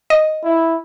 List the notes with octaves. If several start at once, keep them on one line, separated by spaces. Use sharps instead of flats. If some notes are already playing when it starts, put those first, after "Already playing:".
D#5
E4